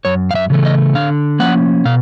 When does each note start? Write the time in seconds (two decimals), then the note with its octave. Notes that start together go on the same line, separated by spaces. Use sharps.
0.05 F#2 C#5
0.31 F5
0.35 E5
0.50 C#3 E3 A3
0.65 D#5
0.95 D3 F5
1.39 F3 A#3 C#4 F#5
1.85 B2 F5